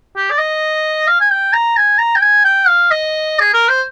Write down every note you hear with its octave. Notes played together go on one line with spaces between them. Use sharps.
G4
D5
D#5
F5
G#5
G5
A#5
G#5
A#5
G5
G#5
G5
F5
D#5
G#4
A#4
C5